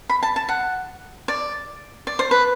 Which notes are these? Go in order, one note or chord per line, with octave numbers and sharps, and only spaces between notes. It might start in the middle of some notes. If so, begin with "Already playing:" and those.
B5
A5
A5
F#5
D5
D5
C5
B4